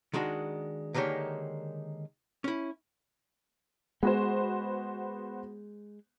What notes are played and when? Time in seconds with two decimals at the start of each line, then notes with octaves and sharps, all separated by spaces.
0.13 D#3 G#3 D4 F#4
0.94 D3 D#3 G#3 A#3 G4 C#5
2.44 C#4 E4
4.03 G#3 B3 F#4 C5